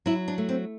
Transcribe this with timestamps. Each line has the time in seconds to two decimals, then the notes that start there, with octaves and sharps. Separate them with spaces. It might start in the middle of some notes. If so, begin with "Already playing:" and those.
0.06 F#3 E4
0.28 D4
0.38 A3
0.49 C4